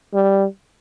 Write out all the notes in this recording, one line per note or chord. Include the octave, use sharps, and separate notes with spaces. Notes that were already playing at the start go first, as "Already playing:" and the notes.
G3